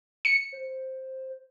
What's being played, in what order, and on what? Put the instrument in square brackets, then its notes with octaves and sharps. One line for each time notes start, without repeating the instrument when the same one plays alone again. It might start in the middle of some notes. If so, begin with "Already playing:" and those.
[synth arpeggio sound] C#7
[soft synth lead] C5